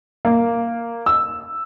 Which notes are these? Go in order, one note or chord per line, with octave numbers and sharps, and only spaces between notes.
A#3
E6